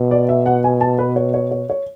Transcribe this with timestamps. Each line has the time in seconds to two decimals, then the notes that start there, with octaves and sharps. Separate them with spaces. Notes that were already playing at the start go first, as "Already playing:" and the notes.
Already playing: B2
0.11 D5
0.29 E5
0.46 F#5
0.64 G#5
0.81 A5
0.99 B4
1.16 C#5
1.34 C#5
1.51 C#5
1.70 C#5